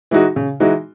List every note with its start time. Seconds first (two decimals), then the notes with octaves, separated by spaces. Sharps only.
0.11 E3 G#3 D#4 F#4
0.36 C#3
0.60 E3 G#3 D#4 F#4